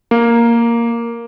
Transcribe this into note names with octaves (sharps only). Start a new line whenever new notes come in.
A#3